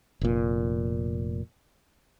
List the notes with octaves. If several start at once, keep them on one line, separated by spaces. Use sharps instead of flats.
F1 A#2